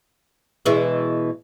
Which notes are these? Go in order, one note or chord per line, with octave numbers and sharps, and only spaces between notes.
B2 E3 G#3